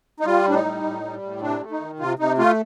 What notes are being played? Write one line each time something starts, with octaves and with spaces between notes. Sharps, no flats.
D#4
G3 F4
A2 D4
D#4
G3
A2
G3
A2
C3 D4
A3
D#4
D#3
C3 F4
C3 D#4
A3 F4